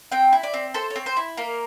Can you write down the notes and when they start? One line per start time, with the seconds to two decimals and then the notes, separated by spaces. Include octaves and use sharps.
0.12 C4 G5
0.33 E4
0.43 D5
0.54 C4
0.74 A4 C5
0.90 C#5
0.96 C4
1.06 C5
1.17 E4
1.37 A#3 A#4